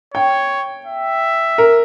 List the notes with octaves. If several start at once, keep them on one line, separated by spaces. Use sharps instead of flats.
C#5 G5
E5
A#4